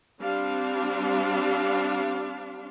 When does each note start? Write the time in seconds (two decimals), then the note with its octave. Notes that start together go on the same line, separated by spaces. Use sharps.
0.20 G3 C4 D4 F5